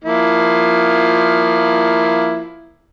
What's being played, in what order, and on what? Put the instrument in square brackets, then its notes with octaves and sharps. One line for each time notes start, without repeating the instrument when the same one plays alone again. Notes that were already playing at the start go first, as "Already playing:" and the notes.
[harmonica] F3 A#3 E4